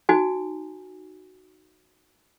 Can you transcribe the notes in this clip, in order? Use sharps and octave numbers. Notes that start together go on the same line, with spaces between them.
D#4 F#4 G#5